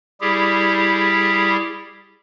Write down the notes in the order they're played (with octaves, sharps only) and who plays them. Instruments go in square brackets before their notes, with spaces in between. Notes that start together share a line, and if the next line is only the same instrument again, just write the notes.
[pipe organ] G3 E4 G4 G#4